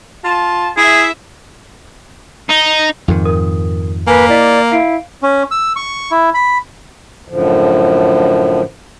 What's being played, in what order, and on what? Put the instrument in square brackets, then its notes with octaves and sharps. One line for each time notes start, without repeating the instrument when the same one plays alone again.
[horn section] F4 A5
[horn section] E4 E5 [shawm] G#4
[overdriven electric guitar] D#4
[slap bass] F2 G#2 D#3
[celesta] A#4 D#6
[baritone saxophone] A#3 [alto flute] B4 [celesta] G#5
[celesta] E4 D#5 B6 [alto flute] D5
[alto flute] E4 [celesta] F5 C7 D7
[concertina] C#4
E6
C#6
E4
B5
[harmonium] F#2 A2 D3 F3